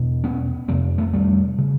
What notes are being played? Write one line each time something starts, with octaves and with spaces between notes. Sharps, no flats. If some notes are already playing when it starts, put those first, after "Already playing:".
Already playing: E2 B2
B3 C#4
F2 C3 A#3 C4
A3 B3
G3 A3
C#3